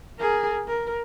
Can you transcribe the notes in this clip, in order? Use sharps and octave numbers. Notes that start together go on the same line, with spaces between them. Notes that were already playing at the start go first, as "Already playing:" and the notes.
G#4 A#4
A#4